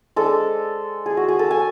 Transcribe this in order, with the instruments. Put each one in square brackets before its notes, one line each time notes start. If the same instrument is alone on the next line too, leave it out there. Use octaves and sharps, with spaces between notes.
[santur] G#3 D4 A4
G#4
F#4
G#4
A4
G#5